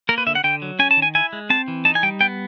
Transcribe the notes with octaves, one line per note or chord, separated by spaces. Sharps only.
A#3 A#4
B4
D3 E5
F#5
D3 G5
F#3
C#4 G#5
A5
D#3
G#5
E4 G#5
G#3
C4 A5
E3
D#4 A5
G#5
G3 G5
B3 G5